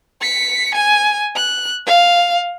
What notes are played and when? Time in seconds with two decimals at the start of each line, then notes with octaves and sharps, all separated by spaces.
0.22 B6 C#7
0.74 G#5
1.36 F#6
1.86 F5